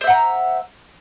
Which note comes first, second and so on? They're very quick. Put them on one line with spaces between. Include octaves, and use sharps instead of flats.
C5 E5 F#5 A#5